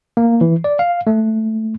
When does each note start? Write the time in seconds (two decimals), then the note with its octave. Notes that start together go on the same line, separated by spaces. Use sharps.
0.17 A#3
0.41 E3
0.64 D5
0.79 F5
1.07 A3